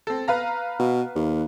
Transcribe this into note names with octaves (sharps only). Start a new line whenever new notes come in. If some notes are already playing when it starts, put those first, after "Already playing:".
C4 A4
B4 F5 A#5
B2
D#2